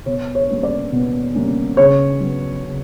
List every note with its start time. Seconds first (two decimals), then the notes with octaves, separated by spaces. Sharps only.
0.06 B2 C#5
0.35 C#5
0.50 G3 A#3 C#4
0.63 D5
0.92 B2
1.35 G3 A#3 C#4
1.77 C#3 C#5
2.20 F#3 B3
2.64 C#3